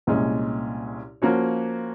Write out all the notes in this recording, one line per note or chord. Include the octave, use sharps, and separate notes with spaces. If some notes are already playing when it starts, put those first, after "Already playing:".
C2 A#2 G#3 C#4
F3 A#3 C#4 F#4 C#5